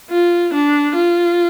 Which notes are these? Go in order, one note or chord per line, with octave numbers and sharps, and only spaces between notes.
F4
D4
F4